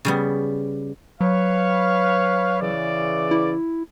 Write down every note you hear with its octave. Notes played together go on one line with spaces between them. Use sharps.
C#3 G3 B3
F#3 B4 C#5 F5
C#3 E3 D5
E4